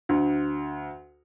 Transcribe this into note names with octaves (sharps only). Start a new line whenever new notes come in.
D2